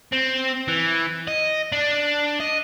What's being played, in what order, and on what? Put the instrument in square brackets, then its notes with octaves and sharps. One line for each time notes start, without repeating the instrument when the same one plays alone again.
[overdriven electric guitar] C4
E3
D#5
D4
D#5